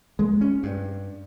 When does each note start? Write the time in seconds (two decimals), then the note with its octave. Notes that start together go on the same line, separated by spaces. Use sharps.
0.19 G#3
0.41 C#4
0.63 G2